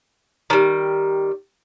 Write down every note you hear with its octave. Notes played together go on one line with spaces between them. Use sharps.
D#3 G3